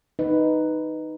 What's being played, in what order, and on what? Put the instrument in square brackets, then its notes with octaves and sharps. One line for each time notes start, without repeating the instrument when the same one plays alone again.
[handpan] D#4 B4